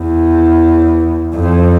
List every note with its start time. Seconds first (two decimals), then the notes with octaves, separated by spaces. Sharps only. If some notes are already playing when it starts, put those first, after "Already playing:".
Already playing: E2
1.36 F2